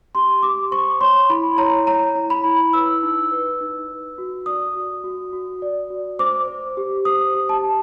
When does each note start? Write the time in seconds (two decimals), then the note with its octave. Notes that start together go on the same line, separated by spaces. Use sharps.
0.15 G4 C6
0.43 G4 D6
0.71 C5 C#6
1.01 C#5 C6
1.30 E4 B5
1.58 C#5 A#5
1.87 C#5 A#5
2.16 E4
2.30 B5
2.45 E4
2.73 B4 E6
3.03 D#4
3.31 B4
3.61 D#4
3.88 B4
4.18 F#4
4.46 D5 D#6
4.75 F#4
5.04 F#4
5.33 F#4
5.62 D5
5.90 F#4
6.19 C5 D6
6.48 C5
6.77 G4
7.05 C5 D#6
7.34 G4
7.49 A5
7.63 G4